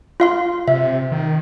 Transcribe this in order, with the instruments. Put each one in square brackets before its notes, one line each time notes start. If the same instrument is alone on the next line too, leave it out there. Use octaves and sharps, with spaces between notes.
[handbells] F4 F5 C6
[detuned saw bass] C3 [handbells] E5
[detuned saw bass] D#3